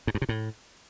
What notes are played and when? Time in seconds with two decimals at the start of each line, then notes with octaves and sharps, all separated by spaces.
0.07 G#2
0.15 G2
0.22 C3
0.29 A2